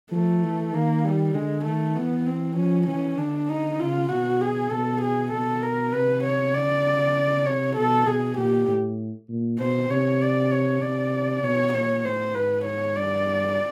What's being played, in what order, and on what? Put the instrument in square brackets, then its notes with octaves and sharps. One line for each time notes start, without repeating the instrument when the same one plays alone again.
[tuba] F3 [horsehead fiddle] A3
[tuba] E3
[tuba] D#3 [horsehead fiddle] A#3
[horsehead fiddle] G3
[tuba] D3 [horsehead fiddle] G#3
[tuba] D#3 [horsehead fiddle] A3
[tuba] E3 [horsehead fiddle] B3
[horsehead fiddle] C4
[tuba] F3 [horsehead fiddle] C#4
[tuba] E3 [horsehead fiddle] C#4
[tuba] D3 [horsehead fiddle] D4
[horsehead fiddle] D#4
[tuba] C#3 [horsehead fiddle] F4
[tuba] B2 [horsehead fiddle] F#4
[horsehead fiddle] G#4
[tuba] B2 [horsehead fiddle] A4
[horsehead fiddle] G#4
[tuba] B2 [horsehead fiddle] A4
[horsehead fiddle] A#4
[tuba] C3 [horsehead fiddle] B4
[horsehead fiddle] C#5
[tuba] C#3 [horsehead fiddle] D5
[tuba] C3 [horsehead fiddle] C#5
[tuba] B2 [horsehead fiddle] A4
[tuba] B2 [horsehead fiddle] G#4
[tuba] A#2 [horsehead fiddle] G4
[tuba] A2
A#2
[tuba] B2 [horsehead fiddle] C5
[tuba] C3 [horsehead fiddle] C#5
[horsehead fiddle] D5
C#5
[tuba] C3 [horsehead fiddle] D5
[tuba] B2 [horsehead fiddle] C#5
[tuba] A#2 [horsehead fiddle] C#5
[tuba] A2 [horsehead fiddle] C5
[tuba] G#2 [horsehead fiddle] B4
[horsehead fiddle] C#5
[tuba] G2 [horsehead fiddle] D5